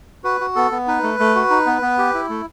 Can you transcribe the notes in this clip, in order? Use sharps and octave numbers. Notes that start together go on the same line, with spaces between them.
F#4 B4
F#4
B3 A4
B3
D#4 B4
A3
A3
F#4
D#4
B3
B3
G4
E4
A3